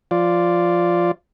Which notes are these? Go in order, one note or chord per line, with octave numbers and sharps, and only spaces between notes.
F3 F4 D5